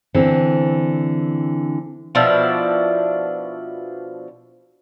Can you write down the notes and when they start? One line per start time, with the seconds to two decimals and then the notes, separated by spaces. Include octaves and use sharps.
0.14 D3 E3 C4
2.15 B2 F3 D4 E4